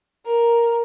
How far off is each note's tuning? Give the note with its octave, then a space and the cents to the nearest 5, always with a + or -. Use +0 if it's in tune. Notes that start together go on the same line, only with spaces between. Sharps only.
A#4 +5